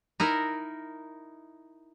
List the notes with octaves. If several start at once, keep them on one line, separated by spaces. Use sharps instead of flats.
D#4 E4 A#4